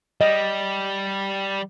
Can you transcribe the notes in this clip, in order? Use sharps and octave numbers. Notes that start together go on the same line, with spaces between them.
G3 D#5